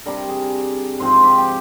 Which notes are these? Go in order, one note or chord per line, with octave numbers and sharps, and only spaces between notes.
C3 G3 D4 A#4
G#4
G#2 F3 C4 C5
G4
G4